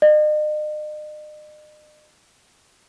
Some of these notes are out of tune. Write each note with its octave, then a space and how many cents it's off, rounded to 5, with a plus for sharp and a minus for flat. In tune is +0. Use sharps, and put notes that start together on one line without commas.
D#5 -45